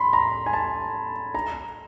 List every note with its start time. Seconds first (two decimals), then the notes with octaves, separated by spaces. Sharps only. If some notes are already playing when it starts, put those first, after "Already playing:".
Already playing: B5 C6
0.13 A#5
0.46 G#5
0.53 A5
1.35 A#5